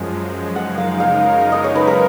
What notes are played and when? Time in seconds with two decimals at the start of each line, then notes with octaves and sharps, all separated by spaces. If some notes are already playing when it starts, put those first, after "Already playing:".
Already playing: F#2 F3 G#3
0.56 F#2 C#3 G#3 D#4 A#4 F#5
0.78 F5
1.00 F5
1.52 D#5
1.64 C#5
1.76 B4
1.87 A#4